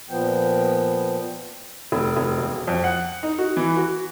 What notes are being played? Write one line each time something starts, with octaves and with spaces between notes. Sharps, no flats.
A#2 F3 B3 G5
F1
F1
E1
F2
F#5
D#4
F#4
E3
F#4